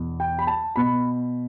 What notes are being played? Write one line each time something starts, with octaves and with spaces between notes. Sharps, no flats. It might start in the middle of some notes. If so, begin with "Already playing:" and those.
Already playing: E2 B2
G5
B5
A5
B2 B5